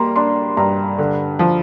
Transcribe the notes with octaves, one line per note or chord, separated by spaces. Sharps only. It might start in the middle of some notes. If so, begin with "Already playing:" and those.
Already playing: G3 A#3 A#5 C6
D4 C6
G2 A#5
D3
F3